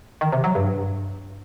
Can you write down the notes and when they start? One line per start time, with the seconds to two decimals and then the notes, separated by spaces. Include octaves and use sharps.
0.21 D#3
0.32 C3
0.44 F#3
0.55 G2